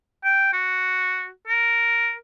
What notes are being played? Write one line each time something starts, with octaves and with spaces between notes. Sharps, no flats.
G5
F#4
A#4